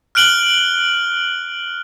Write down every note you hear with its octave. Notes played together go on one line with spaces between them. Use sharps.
F6 F#6 D7 F#7 G7